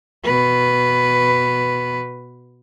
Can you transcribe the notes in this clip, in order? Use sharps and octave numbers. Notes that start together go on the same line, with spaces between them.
B2 B4